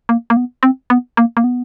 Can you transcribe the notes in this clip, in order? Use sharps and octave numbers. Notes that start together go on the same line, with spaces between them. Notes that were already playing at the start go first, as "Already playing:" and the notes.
A#3
A#3
B3
C4
B3
A#3
A#3
B3